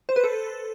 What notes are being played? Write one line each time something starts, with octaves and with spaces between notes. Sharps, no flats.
C5
B4
A4